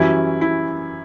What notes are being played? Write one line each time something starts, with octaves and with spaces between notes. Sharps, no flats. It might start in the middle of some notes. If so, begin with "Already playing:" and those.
Already playing: F#2 E3 G3 C#4 E4
E4